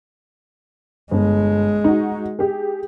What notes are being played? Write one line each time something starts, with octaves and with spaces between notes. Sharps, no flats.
G1 G#3
D#4 F#4
G4 G#4